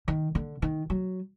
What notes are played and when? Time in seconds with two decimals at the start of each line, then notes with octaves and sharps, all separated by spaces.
0.08 D#3
0.35 D3
0.62 D#3
0.90 F#3